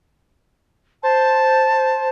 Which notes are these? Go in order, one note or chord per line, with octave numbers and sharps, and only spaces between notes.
C5 A5